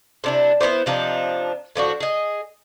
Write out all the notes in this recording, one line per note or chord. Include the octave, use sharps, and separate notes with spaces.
C3 D4 E4
B3 D4 E4 C5
C3 F3 D4 D#4
A2 F3 D4 F#4
G#4 D#5